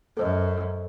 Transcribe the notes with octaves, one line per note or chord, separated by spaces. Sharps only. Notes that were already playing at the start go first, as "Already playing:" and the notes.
F#2 A4 C5 D#5